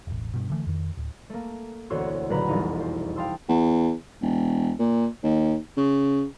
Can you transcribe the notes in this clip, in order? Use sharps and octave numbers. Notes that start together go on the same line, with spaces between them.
E1 A1
G2 B2
D3 E3 A3
F2 D#3
D1
A3 A#3
E1 D2 F#4 C5 C#5 E6
F#1 A#2 D3 B4 A#5
E1 C2 F2 D#4 G#5
C5
F5 G5 A5 C6 D#6 E6
E2
E1
A#2
D#2
C#3